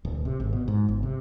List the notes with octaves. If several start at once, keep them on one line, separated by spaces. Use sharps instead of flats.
D1
C3
G#1
B2
G#2
G1
C3